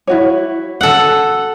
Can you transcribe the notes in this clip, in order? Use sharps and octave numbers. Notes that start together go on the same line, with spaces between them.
E4 F#4 C#5
A4 F#5